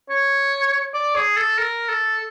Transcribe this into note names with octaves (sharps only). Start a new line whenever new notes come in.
C#5
D5
G#4
A4
A#4
A4